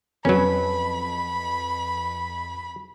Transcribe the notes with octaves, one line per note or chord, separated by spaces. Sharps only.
F2 F#3 C#4 B4 B5